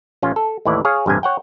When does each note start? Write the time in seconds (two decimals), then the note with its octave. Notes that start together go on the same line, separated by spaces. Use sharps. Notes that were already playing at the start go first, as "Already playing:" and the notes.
0.22 A1 C#4 F4
0.36 A4
0.65 D#2 A2 E3 E4 D5
0.85 G#4 C#5 F5 G#5
1.06 A1 G2 C3 G#5
1.23 C#5 F#5 G5